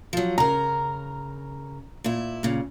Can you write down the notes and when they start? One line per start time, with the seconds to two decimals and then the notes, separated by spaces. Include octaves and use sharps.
0.13 F3 F#3
0.38 C#3 A#4 A#5
2.04 A#2 E4
2.43 A#2 C#3